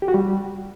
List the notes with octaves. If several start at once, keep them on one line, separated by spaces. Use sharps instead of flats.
G4
F#4
G3